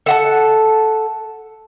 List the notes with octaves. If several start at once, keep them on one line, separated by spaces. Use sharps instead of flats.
A4 F#5 A5